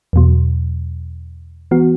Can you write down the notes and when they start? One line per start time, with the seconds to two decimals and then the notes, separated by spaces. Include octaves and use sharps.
0.13 E2 B2 F#3
1.71 E3 B3 F#4